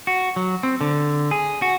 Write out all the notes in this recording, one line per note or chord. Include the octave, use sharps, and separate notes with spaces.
F#4
F#3
C4
D3
G#4
F#4